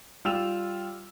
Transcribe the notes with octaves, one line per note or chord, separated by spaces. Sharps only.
G3 F4 G5 E6 E7 F7